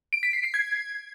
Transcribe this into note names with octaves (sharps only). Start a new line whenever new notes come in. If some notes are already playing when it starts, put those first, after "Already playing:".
D7
B6
C7
C7
G#6